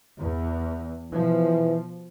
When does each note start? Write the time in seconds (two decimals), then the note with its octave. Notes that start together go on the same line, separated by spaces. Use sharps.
0.17 E2
1.12 B2 E3 F3